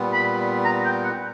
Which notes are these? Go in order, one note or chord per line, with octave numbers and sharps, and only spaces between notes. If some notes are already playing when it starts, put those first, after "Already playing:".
Already playing: A#2 G3 B3
B5
A#5
G5
F#5